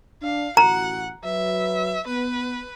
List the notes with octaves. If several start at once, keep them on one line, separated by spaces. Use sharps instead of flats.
D4 F5
A1 F#4 F#5 A#5
F#3 B4 E5
B3 B4